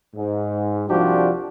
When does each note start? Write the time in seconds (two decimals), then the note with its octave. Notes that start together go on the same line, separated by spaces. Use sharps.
0.15 G#2
0.88 C2 F3 G3 D4 F#4 G4